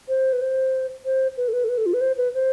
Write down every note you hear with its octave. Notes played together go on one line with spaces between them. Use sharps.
C5
B4
C5
C5
B4
A4
B4
A4
B4
A4
F4
B4
C5
B4
C5